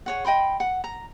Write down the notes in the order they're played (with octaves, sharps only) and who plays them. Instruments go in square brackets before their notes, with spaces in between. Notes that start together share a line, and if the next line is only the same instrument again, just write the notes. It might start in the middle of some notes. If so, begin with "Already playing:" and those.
[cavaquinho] G#4 C#5 F#5
D#5 G5 B5 C6
F#5
A#5